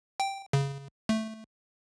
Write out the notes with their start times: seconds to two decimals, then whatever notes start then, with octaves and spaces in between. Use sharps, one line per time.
0.20 G5
0.53 C#3
1.09 A3